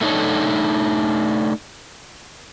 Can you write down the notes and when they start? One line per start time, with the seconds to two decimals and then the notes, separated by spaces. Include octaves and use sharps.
0.01 A3 D4 D#4 A4 C#5